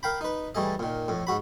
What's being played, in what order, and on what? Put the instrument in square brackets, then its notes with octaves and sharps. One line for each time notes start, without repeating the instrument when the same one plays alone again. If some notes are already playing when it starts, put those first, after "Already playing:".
[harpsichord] A#4 F5 G5 B5
D#4 B4
E3 G3 A3 G#4 D#5
A#2 D#3
F2 A2
G#2 F#4 B5